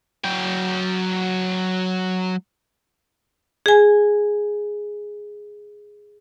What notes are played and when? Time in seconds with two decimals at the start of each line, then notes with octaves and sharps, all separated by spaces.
0.24 F#3 G5
3.66 G#4 G#5